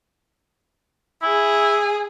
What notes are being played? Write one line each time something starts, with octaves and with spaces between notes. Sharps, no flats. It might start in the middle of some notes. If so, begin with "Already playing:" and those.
E4 G#4